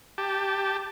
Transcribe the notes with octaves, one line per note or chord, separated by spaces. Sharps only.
G4 A5